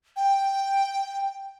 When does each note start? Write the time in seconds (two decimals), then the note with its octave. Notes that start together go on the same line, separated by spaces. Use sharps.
0.16 G5